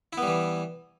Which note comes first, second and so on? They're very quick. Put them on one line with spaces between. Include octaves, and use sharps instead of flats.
E4 B3 G3 E3